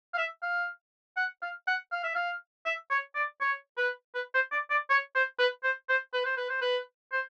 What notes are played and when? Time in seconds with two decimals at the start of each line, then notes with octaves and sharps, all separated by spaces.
0.14 F5
0.18 E5
0.43 F5
1.17 F#5
1.42 F5
1.68 F#5
1.92 F5
2.04 E5
2.15 F5
2.66 E5
2.91 C#5
3.15 D5
3.41 C#5
3.77 B4
4.15 B4
4.34 C5
4.52 D5
4.71 D5
4.90 C#5
5.15 C5
5.39 B4
5.63 C5
5.89 C5
6.14 B4
6.26 C5
6.37 B4
6.50 C5
6.62 B4
7.12 C5